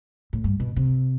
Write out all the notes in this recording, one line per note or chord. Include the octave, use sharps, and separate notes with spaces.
A2
G2
B2
C3